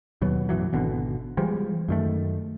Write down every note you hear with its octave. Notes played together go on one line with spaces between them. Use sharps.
D#2 B2 F#3 B3
A1 F#2 E3 F#3
G#1 B2 D3
E3 F3 G3 G#3
F#2 D#3 A3